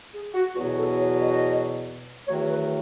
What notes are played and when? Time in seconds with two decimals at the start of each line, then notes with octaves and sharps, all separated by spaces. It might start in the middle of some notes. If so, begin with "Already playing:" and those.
0.13 G#4
0.34 F#4
0.55 E2 B2 F#3 B3 F#4
0.77 A4
0.99 C#5
1.20 D#5
2.27 E2 D#3 F#3 A3 C#5
2.49 B4